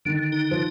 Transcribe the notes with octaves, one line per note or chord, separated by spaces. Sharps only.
D3 D#3
D#4
F3